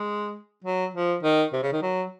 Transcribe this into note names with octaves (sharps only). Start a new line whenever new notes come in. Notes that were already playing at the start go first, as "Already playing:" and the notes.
Already playing: G#3
F#3
F3
D#3
C3
C#3
D#3
F#3